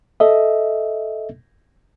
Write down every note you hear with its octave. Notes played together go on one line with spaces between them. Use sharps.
A4 D#5 E5